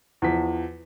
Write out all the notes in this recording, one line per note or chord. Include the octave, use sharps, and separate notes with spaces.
E2 F3 B6